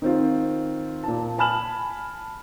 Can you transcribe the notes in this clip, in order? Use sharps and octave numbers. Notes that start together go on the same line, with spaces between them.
D#3 C4 F4
A#2 A5
G#5 A5 B5 F6 E7 F#7